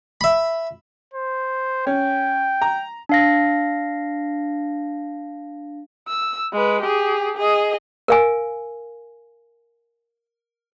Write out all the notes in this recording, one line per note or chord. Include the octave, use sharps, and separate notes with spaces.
E5 B5
C5
C#4 G5
A#5
D4 F5 A#6
E6
G#3 B4
G4 G#4
G#4 D#5
A#4 F5 G#5